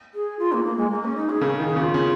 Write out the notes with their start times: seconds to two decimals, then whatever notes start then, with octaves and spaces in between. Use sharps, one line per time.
0.14 G#4
0.39 F4
0.52 A#3
0.64 A#3
0.77 G#3
0.90 A#3
1.04 C#4
1.16 D#4
1.29 G#4
1.41 C#3 A#4
1.55 G#4
1.60 D#3
1.68 G#4
1.76 C#3 F4
1.94 C#3